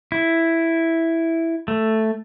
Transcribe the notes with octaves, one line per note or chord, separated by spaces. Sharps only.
E4
A3